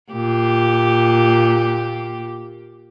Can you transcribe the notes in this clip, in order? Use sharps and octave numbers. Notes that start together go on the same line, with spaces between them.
A#2 G4